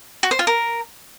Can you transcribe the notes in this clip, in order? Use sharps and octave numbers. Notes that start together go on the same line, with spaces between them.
F#4
C5
F4
A#4